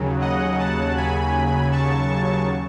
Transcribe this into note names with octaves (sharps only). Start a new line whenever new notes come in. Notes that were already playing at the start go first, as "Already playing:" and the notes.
Already playing: D#2 C#3 F#3
D#5 F#5
F#5 A5
G#5 B5
A5 C#6